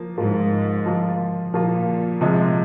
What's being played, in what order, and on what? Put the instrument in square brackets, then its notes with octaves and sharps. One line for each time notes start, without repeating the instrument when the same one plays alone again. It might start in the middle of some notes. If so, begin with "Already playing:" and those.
Already playing: [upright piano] F3 A#3
[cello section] G#2 [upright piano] F3 A#3 F4
[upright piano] F3 A#3 F4
[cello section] A#2 [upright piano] F3 A#3 F4
[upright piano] C3 F3 G#3